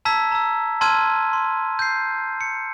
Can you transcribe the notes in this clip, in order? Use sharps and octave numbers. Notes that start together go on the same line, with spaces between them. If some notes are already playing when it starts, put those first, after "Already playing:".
A5 A#5 E6 G#6 B6
A#5 E6
A5 C6 E6 F6 G#6 D#7
C6
G6 C7
C#7